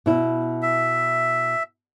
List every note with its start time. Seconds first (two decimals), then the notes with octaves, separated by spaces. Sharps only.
0.06 B2 E4
0.62 E5